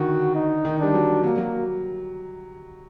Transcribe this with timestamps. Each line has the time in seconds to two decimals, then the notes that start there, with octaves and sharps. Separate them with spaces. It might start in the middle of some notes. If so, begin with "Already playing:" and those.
Already playing: D3 D#3 F#4
0.35 D#4
0.65 D#3
0.79 G3 D4
0.94 F#3
1.23 F#3 A#3
1.37 F#3